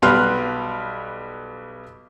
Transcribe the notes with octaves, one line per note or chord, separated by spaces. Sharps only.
B1 G3 B3 C6 F6 F#6